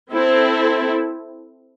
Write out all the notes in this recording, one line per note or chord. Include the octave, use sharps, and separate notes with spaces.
C4 E4 A4